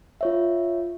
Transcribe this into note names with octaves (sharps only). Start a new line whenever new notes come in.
F4 C#5 E5